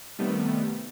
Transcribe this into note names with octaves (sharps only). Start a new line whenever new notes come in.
C3 D#3 G3 A3 B3